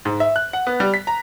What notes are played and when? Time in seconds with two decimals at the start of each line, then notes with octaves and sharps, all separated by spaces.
0.05 G#2
0.20 E5
0.36 F#6
0.53 F#5
0.67 B3
0.80 G3
0.94 B6
1.07 A#5